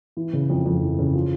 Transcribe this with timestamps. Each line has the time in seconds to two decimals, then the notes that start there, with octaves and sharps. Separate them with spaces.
0.17 E3
0.33 C#3
0.50 F2
0.66 F2
0.81 E3
0.99 C#3
1.15 F3